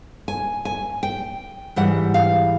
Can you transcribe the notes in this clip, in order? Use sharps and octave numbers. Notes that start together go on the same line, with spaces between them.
G#5
G#5
G5
G#2 E3 G3 F#5
F5